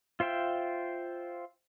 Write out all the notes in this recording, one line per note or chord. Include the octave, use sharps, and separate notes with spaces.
F4 C5 E5 G5